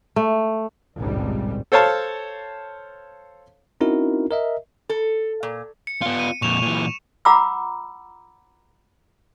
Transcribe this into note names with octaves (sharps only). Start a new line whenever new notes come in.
A3
G#1 C#2 G2 A#2 C#3 G3
A4 C5 C#5 F5 A5
C4 C#4 D#4 E4 F#4 A#4
A#4 D#5 E5
A4
A#2
C#7
B3 F4
D#7
F2 A#2 C#6 E7 F7
A#2 E3
F4 F#5 A#5 B5 D6 E6